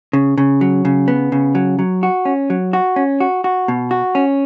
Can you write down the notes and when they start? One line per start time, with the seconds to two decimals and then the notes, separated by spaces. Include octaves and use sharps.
0.13 C#3
0.38 C#3
0.61 F#3
0.85 C#3
1.08 B3
1.32 C#3
1.55 F#3
1.79 F#3
2.03 F#4
2.25 C#4
2.50 F#3
2.73 F#4
2.96 C#4
3.20 F#4
3.44 F#4
3.68 B2
3.91 F#4
4.15 C#4